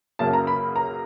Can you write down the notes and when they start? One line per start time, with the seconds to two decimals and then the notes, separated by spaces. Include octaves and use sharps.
0.19 F#2 C#3 F#3 A#3 A5
0.33 A#5
0.47 B5
0.76 A#5